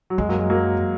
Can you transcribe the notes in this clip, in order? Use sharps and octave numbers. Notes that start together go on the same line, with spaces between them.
F#3
F#2 G#3
F#3 A#3
G#3
F#3 A#3